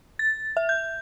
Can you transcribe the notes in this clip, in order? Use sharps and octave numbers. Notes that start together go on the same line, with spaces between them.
A6
E5
G6